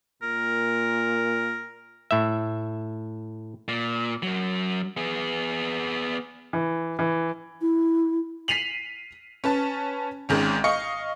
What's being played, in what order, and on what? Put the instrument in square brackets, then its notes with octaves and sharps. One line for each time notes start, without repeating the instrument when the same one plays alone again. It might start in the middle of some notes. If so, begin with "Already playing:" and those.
[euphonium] A#2 [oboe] A#4
[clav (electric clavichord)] A2 E5
[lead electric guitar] A#2
F#2 F#3
B3 G#4
[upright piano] E3
E3
[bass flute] E4
[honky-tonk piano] B6 C7 D#7 F7 F#7
C#4 B4 A5
G#1 G#2 D#3 C#4
D#5 F5 C#6 C#7